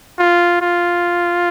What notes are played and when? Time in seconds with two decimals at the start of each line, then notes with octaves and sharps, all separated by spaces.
0.19 F4
0.62 F4